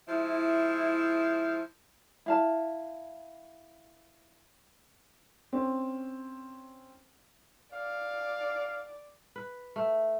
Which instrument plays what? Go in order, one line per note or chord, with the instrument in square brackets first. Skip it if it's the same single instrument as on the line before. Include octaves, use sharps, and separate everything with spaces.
[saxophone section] F3 G#3 E4
[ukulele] E4 F5 A5
[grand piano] C4 C#4
[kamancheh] D5 [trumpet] F5
[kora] B4
A3